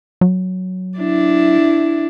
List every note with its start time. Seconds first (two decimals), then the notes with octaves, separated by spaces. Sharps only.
0.21 F#3
0.98 D4 E4